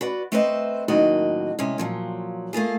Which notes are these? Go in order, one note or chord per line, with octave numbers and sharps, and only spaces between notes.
F#4 B4 D5
A3 C4 B4 C5 D#5 E5
F#2 A2 D#3 A#3 F#4 D#5
C3 G#3 C#4
A#2 F3 F#3
A3 A#3 F4 G#4